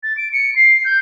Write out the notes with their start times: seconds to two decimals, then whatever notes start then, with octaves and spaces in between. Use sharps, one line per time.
0.03 A6
0.17 D7
0.33 C#7
0.56 C7
0.85 G6